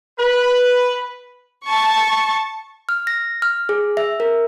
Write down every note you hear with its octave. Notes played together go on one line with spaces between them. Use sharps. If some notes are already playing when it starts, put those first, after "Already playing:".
B4
A5 C#6
F6
A#6
F6
G#4
E5
A#4